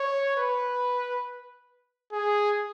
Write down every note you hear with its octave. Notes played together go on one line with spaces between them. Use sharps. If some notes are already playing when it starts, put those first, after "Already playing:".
Already playing: C#5
B4
G#4